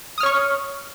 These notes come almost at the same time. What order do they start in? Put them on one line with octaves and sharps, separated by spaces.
D#6 F6 C#5 C#6